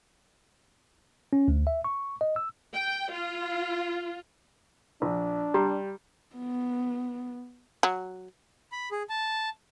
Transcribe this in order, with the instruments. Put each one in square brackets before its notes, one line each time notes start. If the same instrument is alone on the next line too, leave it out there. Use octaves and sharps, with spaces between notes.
[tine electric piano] C#4
D2
E5
C#6
D#5
E6
[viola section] G5
F4
[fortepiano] A#1 [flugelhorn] D4
[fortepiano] G3 [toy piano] G4 A#5
[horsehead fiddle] B3
[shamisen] F#3
[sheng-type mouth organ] B5
G#4
A5